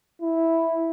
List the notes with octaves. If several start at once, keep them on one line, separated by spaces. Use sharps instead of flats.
E4